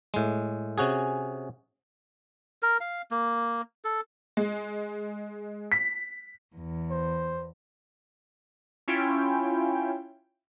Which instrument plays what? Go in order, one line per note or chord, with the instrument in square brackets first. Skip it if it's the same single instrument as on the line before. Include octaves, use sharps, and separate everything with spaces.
[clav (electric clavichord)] A2 G#3
C3 C#4 F#4 G#4
[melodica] A#4
F5
A#3
A4
[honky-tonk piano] G#3
B6
[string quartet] E2
[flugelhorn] C5
[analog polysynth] C#4 E4 F4 G5